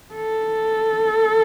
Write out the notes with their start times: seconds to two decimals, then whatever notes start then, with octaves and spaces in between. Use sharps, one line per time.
0.15 A4